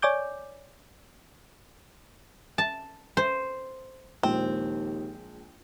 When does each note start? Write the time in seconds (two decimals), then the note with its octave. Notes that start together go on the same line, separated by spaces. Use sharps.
0.02 C#5 D5 G#5 D6 G6
2.58 A5
3.17 C5
4.23 A#1 D#2 F3 G#3 C4